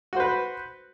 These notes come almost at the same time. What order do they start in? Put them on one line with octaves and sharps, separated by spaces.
F#4 C5 B4